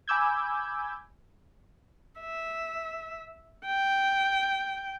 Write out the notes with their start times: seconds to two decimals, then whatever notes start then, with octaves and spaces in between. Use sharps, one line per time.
0.08 G#5 B5 D6 E6 G6 G#6
2.20 E5
3.66 G5